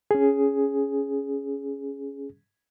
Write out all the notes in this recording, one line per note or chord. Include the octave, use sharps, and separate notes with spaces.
C#4 G#4